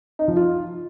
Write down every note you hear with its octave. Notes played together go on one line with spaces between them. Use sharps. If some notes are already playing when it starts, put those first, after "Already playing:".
D#4
F3
F4